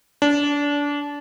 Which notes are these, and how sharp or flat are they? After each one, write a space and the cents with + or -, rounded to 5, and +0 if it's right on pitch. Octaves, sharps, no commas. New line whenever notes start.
D4 -25